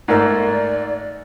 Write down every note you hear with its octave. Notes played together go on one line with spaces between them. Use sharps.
G#2 A3 A#3 D5